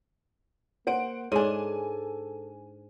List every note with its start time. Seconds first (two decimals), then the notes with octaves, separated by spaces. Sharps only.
0.87 A#3 C5 F#5 D7
1.32 G#2 D4 A4 C#5 G#5 D#7